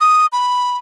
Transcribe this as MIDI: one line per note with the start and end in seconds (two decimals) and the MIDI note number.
0.01 0.26 87
0.32 0.77 83